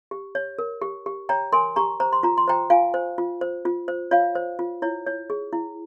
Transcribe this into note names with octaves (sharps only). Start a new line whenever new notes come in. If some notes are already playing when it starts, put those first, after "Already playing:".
G4
C#5
A#4
G4
G4
C#5 G5 A#5
A#4 G#5 C6
G4 A#5 C#6
C5 A#5
C6
F4 A#5
C6
C5 G5 A#5
F4 F5 G#5
C5
F4
C5
F4
C5
F4 C#5 F5
C5
F4
E4 C#5
C#5
G#4
E4